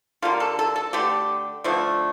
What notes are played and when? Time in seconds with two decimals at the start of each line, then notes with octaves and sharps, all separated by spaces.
0.22 D3 G3 A#3 F4
0.40 A4
0.59 A4
0.76 A4
0.93 D3 A3 G4
1.64 D3 F3 A3